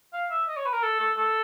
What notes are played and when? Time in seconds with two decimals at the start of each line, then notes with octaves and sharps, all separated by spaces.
0.13 F5
0.31 E5
0.48 D#5
0.57 C#5
0.65 B4
0.73 A#4
0.83 A4
1.00 A4
1.17 A4